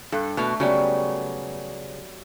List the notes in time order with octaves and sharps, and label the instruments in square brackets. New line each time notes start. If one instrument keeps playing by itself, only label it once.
[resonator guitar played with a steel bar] G2 [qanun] A4
[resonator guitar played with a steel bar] B2 [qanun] A3 F5
[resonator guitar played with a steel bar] C#3 [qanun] F#3 G3 B3